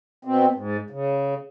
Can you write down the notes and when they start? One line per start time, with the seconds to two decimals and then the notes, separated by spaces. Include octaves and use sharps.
0.25 B2 C4
0.55 G#2
0.90 C#3